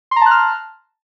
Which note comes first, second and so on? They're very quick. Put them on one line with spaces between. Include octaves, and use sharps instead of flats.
C6 A#5 A5 F#6 F6